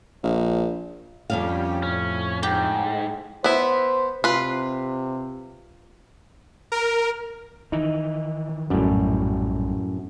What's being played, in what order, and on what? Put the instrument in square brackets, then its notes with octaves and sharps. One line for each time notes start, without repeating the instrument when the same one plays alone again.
[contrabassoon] A#1
[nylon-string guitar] F2 C3 F5 [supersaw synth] G3 C#4 G4
[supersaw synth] A2 [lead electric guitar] C#4
[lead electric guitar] G#2 [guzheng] G4
[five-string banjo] B3 E4 [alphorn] C5
[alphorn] C3 [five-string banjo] F4 B4
[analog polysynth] A#4
[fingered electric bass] D#3 E3 [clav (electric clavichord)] D#4
[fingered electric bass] A#1 G3 [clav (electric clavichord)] F#2 A2